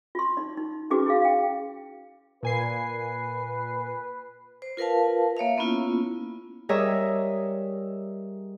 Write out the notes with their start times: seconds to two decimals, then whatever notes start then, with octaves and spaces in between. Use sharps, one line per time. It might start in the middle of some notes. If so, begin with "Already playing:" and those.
0.15 F4 C6
0.37 D#4 D5
0.57 D#4
0.90 C#4 D#4 F#4 G#4 B4 D6
1.06 E4 G#4 F5
1.22 F5 G5
2.43 A#2 B4 G#5 C7
4.62 C5
4.77 F4 A#4 B4 F5 A5
5.37 A#3 C#5 E5 F5
5.58 A#3 B3 C#4 E4 F4
6.69 G3 G#4 A#4 C#5 D#5 E5